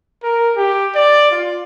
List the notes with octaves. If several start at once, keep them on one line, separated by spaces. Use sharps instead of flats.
A#4
G4
D5
F4